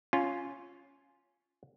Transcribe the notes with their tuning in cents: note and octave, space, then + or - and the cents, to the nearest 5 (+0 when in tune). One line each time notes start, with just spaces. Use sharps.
C#4 +5 F4 +0